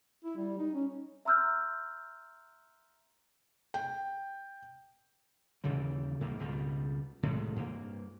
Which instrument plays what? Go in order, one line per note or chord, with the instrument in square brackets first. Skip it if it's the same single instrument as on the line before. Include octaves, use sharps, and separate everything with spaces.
[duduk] E4
G3
D#4
C#4
[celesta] E5 A#5 C6 E6 F6 G6
[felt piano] G5
[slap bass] D#2 C#3 E3 G3
C2 G#2 G3 A#3
C#2 B2 G3
C2 A2 D#3 G#3
G2 A#3